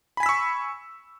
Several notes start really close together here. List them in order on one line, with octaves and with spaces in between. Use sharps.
B5 G#5 B6 E6 C#6